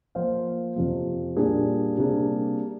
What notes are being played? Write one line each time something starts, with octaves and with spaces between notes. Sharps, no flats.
F3 A#3 F4 C5 F5
F2 C3 F3
A#2 G3 A#3 D4 G#4
C3 G3 A#3 D4 G#4